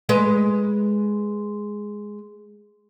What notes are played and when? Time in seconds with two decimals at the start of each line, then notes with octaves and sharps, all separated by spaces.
0.09 G#3 B4 D#5